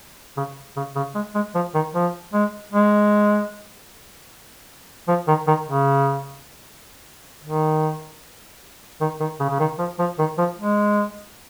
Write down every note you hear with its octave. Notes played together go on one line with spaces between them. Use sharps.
C#3
C#3
C#3
G#3
G#3
F3
D#3
F3
G#3
G#3
F3
D#3
D#3
C#3
D#3
D#3
D#3
C#3
C#3
D#3
F3
F3
D#3
F3
G#3